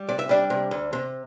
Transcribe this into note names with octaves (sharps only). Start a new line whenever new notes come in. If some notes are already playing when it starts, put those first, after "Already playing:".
Already playing: G3
C3 D5
E5
G3 D4 D5
C3
D2
C3